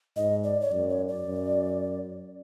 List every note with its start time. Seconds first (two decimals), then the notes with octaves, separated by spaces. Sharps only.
0.16 G#2 D#5
0.44 D5
0.61 C#5
0.72 F#2 D5
0.89 C#5
1.08 D5
1.27 F#2